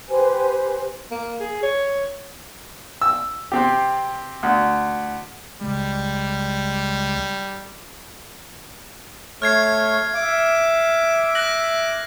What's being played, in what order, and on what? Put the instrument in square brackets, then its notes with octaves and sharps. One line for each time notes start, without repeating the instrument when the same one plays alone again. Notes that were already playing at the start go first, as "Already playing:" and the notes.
[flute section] G4 B4 C5 G#5
[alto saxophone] A#3
G#4
C#5
[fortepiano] E6
C3 C4 G4
D2
[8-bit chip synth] C#2 C#3 G#3 [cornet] G3
[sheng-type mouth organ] A3 C#5 [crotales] F6 G#6 C7
[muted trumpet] E5 [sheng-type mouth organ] D6
[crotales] F#6 A#6 F#7